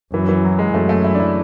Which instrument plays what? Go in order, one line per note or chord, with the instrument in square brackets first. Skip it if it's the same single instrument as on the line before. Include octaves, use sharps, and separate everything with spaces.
[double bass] F#2 [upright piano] E3
[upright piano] E3
F#3
G#3
[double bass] F#2 [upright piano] A3
[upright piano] A3
E4
D4
E4